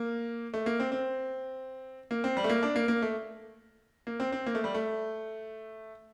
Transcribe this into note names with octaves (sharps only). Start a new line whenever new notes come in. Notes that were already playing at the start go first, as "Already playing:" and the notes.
Already playing: A#3
A3
A#3
C4
C4
A#3
C4
G3
A3
A#3
D4
A#3
A#3
A3
A#3
C4
C4
A#3
A3
G3
A3